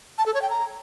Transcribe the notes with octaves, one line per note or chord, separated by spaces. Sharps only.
A5
A4
C#5
G5
A#5